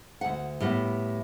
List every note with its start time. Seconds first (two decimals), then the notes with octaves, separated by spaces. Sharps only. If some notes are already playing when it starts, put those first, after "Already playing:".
0.21 D2 F#5
0.60 A2 G3 B3